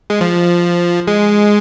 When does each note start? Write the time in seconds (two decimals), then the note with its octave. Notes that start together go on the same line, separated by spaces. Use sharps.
0.10 G#3
0.21 F3
1.07 G#3